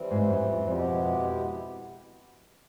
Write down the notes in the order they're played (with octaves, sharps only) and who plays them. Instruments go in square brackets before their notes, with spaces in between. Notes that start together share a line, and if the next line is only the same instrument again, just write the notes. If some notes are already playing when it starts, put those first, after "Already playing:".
Already playing: [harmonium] E3 G3 C4
[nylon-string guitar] G#2
F#2
F2
[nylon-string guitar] F2 [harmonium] B2 G#3 B3 E4 G4